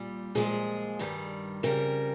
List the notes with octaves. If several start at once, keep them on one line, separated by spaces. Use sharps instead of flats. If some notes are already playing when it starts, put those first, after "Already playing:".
Already playing: A#2 G3
A#2 F3 G#3 G#4
G2 D#3 G3
F2 C#3 G3 A#4